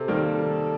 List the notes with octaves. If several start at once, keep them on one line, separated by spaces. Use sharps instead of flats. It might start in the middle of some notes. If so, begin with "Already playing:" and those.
Already playing: C3 A4
D#3 G3 A#3